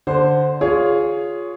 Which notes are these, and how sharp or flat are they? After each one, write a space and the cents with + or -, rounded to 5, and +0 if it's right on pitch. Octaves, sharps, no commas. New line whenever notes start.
D3 +0 C5 +0
F4 +10 G#4 +0 C#5 +20